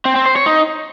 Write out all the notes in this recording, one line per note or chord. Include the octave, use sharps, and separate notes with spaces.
C4
C4
C5
C#5
D#4